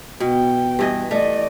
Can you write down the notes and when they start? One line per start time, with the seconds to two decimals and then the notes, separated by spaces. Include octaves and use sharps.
0.20 B2 B3 G5
0.79 G2 E3 D#5
1.11 A3 D5 D#5